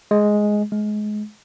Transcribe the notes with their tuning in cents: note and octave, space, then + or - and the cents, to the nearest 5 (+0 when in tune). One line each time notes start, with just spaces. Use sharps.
G#3 +5
G#3 +25